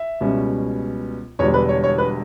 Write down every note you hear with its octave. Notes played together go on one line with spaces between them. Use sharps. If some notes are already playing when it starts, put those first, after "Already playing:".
Already playing: E5
C#2 B2 G3 C#4
E1 E2 D3 G3 D4 C#5
B4
C#5
C#5
B4